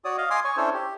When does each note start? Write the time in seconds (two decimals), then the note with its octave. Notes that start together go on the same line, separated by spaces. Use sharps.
0.05 F#4 C#5 D5 D#6
0.18 D#5 F5
0.30 G#5 C6 D6 D#6
0.44 C#5 G#5 C#6
0.57 C#4 D4 E4 A4 C5 C#5
0.74 G4